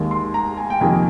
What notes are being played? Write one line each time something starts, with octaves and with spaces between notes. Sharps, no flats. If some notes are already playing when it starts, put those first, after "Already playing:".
Already playing: D#2 D#3 G#3
C6
A#5
G#5
G5
F2 C3 D#3 A#3 G#5